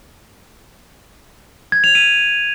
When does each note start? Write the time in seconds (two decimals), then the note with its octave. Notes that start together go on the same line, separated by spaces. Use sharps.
1.72 G#6
1.84 F7
1.95 D#7